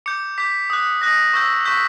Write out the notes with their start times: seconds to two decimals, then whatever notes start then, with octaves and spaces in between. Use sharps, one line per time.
0.06 D6 G6 C#7
0.38 D6 G6 B6
0.70 D#6 F#6
1.01 D#6 F#6 A#6
1.34 C#6 E6 G6
1.65 C#6 E6 G6 B6